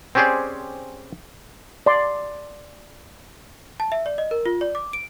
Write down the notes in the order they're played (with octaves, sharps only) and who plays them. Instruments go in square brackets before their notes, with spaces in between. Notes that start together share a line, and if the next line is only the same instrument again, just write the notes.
[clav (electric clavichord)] C4 C#4 G4 G#4 C5 D5
[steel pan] D5 C6
[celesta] A5
E5
D5
D#5
A#4
F4
D5
D6
D7